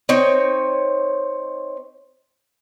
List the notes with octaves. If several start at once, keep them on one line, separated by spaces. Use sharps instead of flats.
C4 D#4 C#5